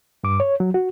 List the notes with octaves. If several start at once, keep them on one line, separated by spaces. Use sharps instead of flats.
G2 D6
C#5
F#3
F#4